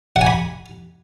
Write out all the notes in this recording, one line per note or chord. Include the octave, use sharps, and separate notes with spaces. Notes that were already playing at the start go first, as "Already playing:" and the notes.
F#5
G#5
B5